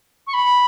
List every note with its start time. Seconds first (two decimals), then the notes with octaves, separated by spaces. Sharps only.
0.27 C#6
0.33 B5